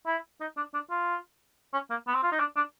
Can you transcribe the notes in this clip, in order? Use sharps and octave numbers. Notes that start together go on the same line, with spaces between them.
E4
D#4
D4
D4
F4
C#4
A#3
B3
C4
F4
D#4
D4
D4